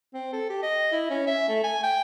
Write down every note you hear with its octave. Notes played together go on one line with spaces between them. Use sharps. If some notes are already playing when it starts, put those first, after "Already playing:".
C4
A4
G4
D#5
E4
C#4
E5
A3
G#5
G5